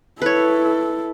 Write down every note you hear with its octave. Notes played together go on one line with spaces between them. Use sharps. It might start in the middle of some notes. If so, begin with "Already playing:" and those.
E4 A4 B4 C#5